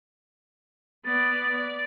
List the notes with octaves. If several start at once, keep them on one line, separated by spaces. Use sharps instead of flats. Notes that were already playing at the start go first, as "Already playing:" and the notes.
B3 D5 A6
D5